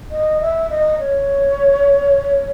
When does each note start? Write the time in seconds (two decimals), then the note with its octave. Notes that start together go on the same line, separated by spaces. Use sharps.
0.11 D#5
0.41 E5
0.70 D#5
0.99 C#5